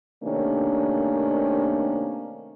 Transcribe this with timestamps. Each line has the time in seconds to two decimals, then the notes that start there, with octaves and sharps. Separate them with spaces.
0.23 C3 D#3 A3 A#3 C#4 D4